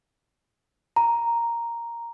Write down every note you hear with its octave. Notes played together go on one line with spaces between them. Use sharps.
A#5